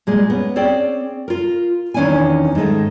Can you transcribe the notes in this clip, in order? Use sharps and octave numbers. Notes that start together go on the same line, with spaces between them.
A#2 G#3 G#4
B3 C#4
C4 C#4 G#4 D5 G5
F4 A#4
E2 D#3 C#4 D4 E4 G#5
G#2 D#3 G#3 A3